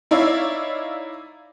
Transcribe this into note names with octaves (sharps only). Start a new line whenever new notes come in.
D#4 E4 C#5 D5 E5 F5